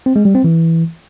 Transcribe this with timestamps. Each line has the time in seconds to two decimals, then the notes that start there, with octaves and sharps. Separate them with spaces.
0.06 C4
0.16 G#3
0.25 G3
0.35 C4
0.44 E3